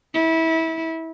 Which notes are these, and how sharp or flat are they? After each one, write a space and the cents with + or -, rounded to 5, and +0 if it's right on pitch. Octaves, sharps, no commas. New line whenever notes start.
E4 -25